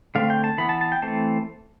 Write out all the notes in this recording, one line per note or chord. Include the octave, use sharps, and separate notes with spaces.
D3 A3 C4 F5
G5
A5
E3 B3 B5
A5
A5
G5
E3 A3 C4 A5